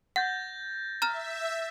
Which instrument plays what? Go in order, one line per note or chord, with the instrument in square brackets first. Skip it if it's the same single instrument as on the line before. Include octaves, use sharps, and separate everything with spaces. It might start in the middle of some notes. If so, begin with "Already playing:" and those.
[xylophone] F#5 [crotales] G6 A6 A#6
[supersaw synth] E5 [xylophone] A#5 F6 E7 [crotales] A6